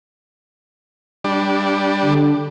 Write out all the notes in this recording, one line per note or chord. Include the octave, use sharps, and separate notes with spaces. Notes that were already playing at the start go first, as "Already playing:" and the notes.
G3 D4
D3